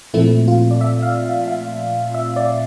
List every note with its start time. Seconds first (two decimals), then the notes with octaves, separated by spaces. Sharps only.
0.14 A#2 F3 A3 C4 E4
0.48 F4
0.71 D5
0.81 E5
1.02 F5
1.25 F5
1.48 F5
2.14 E5
2.36 D5